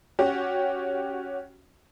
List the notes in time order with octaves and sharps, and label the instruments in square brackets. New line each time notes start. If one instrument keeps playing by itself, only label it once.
[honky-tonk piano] C#4 F#4 G4